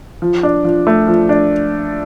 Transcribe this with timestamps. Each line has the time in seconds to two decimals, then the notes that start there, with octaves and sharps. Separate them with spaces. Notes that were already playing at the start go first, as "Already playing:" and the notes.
0.22 F3
0.43 D4
0.64 F3
0.87 A3
1.07 F3
1.29 D4